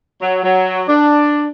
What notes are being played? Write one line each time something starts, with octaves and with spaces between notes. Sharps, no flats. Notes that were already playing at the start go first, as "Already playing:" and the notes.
F#3
F#3
D4